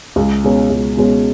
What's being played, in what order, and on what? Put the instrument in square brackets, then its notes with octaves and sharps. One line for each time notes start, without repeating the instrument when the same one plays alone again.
[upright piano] C#2
B2 G#3 C#4
C#2
B2 G#3 C#4